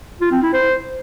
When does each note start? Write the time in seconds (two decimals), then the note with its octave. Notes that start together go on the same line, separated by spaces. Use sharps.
0.21 F4
0.31 C4
0.42 E4
0.53 C5